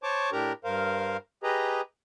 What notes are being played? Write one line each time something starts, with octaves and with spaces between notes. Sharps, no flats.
C5 C#5 A5 C#6 D6
A2 D4 G4 A#4 A#5
G2 A#4 C5 F5
G4 G#4 B4 D#5 A#5